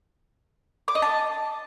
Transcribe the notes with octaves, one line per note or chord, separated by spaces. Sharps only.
D6
D#5
A5